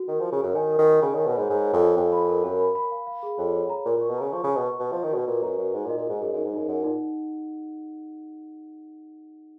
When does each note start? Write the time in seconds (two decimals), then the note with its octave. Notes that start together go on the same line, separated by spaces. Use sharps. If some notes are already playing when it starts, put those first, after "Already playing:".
Already playing: F#4
0.08 D#3 A#4
0.20 F3 A#4
0.32 C#3
0.40 F#2 C#5
0.55 D#3 G#5
0.71 A#4
0.79 D#3
0.87 A#4
1.02 C#3 C#5
1.15 D#3 G#5
1.27 B2
1.34 G#2 B5
1.50 G#2 C#5
1.65 C#5
1.73 F2
1.82 G#5
1.97 F2 F5
2.12 B5
2.29 A#4
2.44 F#2 A#4
2.60 B5
2.75 B5
2.92 F5
3.07 F5
3.23 G#4
3.38 F2 C#5
3.54 C#5
3.70 A#5
3.85 A#2 A#4
3.98 A#2 C#6
4.10 B2
4.17 C#3 A#5
4.33 F3 C#6
4.44 C#3 C#6
4.56 B2
4.64 C#6
4.80 B2 D#5
4.92 F3 D#5
5.03 D#3
5.11 B2 F#4
5.27 A#2 B4
5.42 F#2 A#5
5.58 F#2 F#4
5.74 G#2 D#4
5.86 A#2
5.89 D#5
5.98 A#2
6.06 G#2 G#4
6.21 F#2 G#4
6.33 F#2 D#4
6.45 G#2
6.53 F#2 D#4
6.68 F#2 F#5
6.84 A#2 D#4